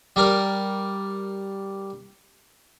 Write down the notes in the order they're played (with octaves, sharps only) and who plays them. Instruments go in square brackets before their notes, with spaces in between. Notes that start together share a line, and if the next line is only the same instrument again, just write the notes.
[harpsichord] G3 A#4